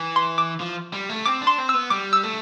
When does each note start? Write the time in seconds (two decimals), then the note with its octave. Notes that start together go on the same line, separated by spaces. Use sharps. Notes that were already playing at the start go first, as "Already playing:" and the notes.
Already playing: E3
0.16 C6
0.38 D6
0.60 F3
0.93 G3
1.09 A3
1.26 C4 D6
1.41 D4
1.47 C6
1.58 C4
1.69 B3 E6
1.90 G3 D6
2.13 E6
2.23 A3